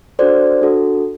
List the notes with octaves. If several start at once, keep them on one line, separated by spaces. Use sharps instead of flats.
D4 F#4 A4 C5 D5
D4 F#4 A4